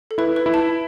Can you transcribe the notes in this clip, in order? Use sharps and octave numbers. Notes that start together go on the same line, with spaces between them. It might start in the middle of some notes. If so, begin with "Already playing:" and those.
A4
E4 B4
B4
E4
A5